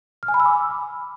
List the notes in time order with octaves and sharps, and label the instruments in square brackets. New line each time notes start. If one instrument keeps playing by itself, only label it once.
[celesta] F6
G#5
B5
E6
D6